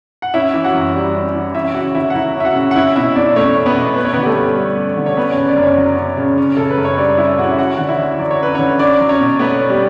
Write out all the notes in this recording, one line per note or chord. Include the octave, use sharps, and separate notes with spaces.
F#5
C#4 E4 E5
E3
F#4 F#5
F#2
G3
C#4
E3
C#4 E4 E5
E5
C#3 F#4 F#5
D2 E4 E5
F#5
F#3 E4 E5
C#4 E5
F#4 F#5
C#3
F#5
C#4 E4 E5
B2 E4 E5
E2 D4 D5
A3 C#4 C#5
C#4
B3 B4
B2
C#4 B4
C#5
D3 B3 B4
G4
A3 A4
G2
G3
C#4
D3
C#5
B3 C#4 B4
C#3 C#4 C#5
D4 D5
F#2
C#4 C#5
F#3
C#4
C#3
C#4
C#3 A4
B4
F#2
C#5
G3 D4 D5
C#4 E4 E5
C#3 F#4 F#5
E5
C#4 F#4 F#5
D3 F#5
E4 E5
D2
F#3 D5
C#5
C#4 B4
D3 C#4 C#5
C#4 D4 D5
F#3
C#4 C#5
B2
A3 B3 B4
C#4
G3 G4